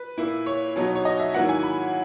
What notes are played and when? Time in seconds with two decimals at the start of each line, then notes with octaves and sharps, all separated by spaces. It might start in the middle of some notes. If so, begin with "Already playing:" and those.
Already playing: B4
0.18 A#2 A#3 E4
0.46 C#5
0.76 B2 F#3 B3 D#4
0.96 C#5
1.05 D#5
1.20 E5
1.34 G#2 D#3 F#3 A#3 E4 F#5
1.49 G#5
1.63 B5